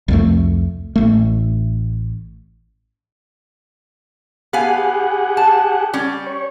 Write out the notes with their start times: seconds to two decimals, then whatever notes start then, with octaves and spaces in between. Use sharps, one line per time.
0.08 C2 F2 A3
0.96 A1 A3
4.53 B3 G4 G#4 F5 F#5 G#5
5.37 A5
5.94 G3 C#4
6.27 C#5